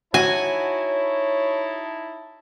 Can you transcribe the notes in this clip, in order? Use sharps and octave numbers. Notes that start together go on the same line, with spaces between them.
D#4 E4 F#4 C#5 G#5 A5